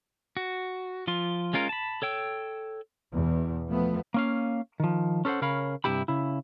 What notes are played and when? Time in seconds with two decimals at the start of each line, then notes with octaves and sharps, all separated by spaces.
0.37 F#4
1.07 F3 F4 C6
1.53 G#3 C#4 F4 A#4
1.69 A5 B5
2.02 A4 C#5 G5 E6
3.13 E2 B2
3.69 F3 A3 B3
4.14 A#3 C#4 F5
4.80 D#3 F3
5.25 C#4 A4 B4 C5 F#5
5.42 C#3 C#4 A#4 C#5 F5 B5
5.84 G2 C3 E4 G4 B5
6.08 C#3 E4